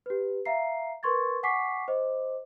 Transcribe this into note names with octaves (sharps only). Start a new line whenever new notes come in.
G4 B4
E5 F5 A#5 C7
A#4 B4 C6 C#6 G#6 A6
F#5 G#5 C#6 D6 B6 C7
C5 D#5 D6